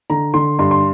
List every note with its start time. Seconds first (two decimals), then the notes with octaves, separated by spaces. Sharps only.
0.10 D3 A#5
0.34 D3 C6
0.59 G2 C6
0.71 C6